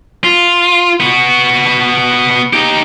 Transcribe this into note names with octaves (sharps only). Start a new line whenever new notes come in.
F4
B3 F#4
D#4 G4